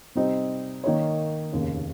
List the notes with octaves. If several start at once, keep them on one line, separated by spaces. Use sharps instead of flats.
C3 G3 C4 D#4
D#3 A#3 D#4 A#4 C#5
F1 D#2 C#3